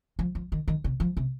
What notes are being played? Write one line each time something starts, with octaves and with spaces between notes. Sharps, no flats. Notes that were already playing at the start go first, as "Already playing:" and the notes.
F3
F3
D#3
D#3
C3
F3
C3